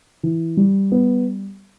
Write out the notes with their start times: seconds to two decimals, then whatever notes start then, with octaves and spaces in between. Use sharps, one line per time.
0.23 E3
0.57 G3
0.92 B3